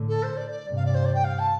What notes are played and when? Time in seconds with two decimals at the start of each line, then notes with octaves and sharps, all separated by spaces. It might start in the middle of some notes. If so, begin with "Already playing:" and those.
Already playing: A2 D3
0.09 A4
0.23 C5
0.37 D5
0.51 D5
0.66 G2 C3
0.76 F5
0.86 D5
0.95 C5
1.05 D5
1.15 G5
1.24 F5
1.39 A5